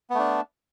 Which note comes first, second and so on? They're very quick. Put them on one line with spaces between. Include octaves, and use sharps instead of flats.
B3 A3 D4